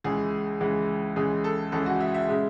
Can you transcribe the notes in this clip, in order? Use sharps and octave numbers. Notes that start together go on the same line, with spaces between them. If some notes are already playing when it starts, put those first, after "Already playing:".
C#2 C#3 E3 G#3 G#4
C#2 C#3 E3 G#3
C#2 C#3 E3 G#3 G#4
A4
C#2 C#3 E3 G#3 A4
F#4
E5
E5
C#3 G#3